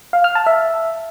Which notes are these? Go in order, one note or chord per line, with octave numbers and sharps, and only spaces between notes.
F5
F6
A5
E5